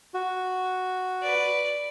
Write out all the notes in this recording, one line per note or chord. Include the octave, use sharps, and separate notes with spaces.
F#4
B4 D5